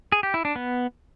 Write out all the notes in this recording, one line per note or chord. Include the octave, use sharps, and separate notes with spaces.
G#4
G4
E4
D4
B3